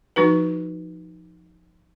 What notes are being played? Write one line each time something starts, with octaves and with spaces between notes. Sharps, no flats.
F3 D#4 F#4 B4